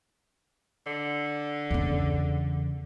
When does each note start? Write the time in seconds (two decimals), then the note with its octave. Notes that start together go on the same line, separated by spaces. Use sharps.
0.86 D3
1.71 E2 C#3